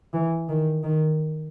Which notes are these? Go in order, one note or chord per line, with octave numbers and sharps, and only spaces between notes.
E3
D#3
D#3